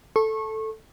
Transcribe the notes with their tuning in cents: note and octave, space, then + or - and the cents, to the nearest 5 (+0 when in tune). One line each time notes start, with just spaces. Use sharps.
A4 +0 C#6 -25